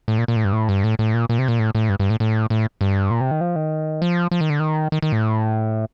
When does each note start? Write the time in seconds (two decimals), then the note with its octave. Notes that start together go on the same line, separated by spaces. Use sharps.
0.08 A2
0.18 A#2
0.28 A#2
0.36 A2
0.45 G2
0.53 A2
0.69 G2
0.84 A2
0.99 A2
1.14 A#2
1.29 A#2
1.39 C3
1.48 A#2
1.59 A2
1.75 A2
1.89 G2
2.00 G2
2.10 A2
2.20 A2
2.50 A2
2.81 G2
3.10 A#2
3.21 C3
3.31 D#3
3.41 F3
3.56 D#3
4.02 F3
4.31 F3
4.41 D#3
4.50 D3
4.60 D#3
4.92 D#3
5.02 D#3
5.12 A2